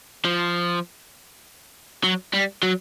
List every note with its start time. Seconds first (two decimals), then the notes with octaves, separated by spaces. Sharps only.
0.25 F3
2.04 F#3
2.33 G3
2.63 F#3